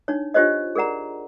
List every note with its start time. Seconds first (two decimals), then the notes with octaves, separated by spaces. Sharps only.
0.08 D4 D#4 C#5
0.34 D4 F4 G4 C5 C#5 D#5
0.75 G#4 A#4 D5 F#5 A#5